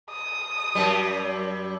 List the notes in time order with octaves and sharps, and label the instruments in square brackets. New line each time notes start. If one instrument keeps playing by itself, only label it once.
[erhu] D#6
[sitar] F#2 G3